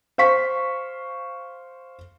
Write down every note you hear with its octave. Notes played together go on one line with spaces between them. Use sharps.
C5 F5 C#6 B6